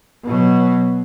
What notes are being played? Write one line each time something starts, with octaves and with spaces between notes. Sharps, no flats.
B2 F#3